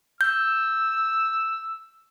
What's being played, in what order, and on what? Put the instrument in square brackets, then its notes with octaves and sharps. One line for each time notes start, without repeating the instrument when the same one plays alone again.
[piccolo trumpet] E6 [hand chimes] G6